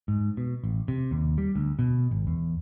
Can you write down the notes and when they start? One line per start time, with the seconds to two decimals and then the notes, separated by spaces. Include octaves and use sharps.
0.08 G#2
0.37 B2
0.64 A1
0.88 C3
1.11 D#2
1.38 G3
1.56 D2
1.79 B2
2.11 G#1
2.27 E2